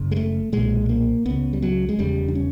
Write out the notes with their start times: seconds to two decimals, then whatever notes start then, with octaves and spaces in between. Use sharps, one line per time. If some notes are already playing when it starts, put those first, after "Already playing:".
Already playing: F#1 C#3
0.11 G#3
0.16 A3
0.52 B1 A#2 G#3
0.89 A#3
1.26 C#2 C#3 B3
1.53 G3
1.62 F#3
1.89 G#3
1.99 F1 E2 C#3 G3
2.28 D4
2.35 C#4